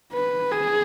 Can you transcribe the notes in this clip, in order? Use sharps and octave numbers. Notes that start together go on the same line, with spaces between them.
B4
G#4